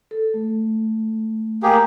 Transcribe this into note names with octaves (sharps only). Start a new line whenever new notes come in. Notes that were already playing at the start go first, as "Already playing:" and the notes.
A4
A3
A#3 G4 G#4